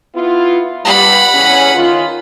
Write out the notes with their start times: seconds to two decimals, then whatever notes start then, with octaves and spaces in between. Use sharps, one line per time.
0.15 B3 E4 F4
0.85 G2 G3 F#5 B5
1.35 E2 C#3 C#4
1.75 D#3 C#4 F4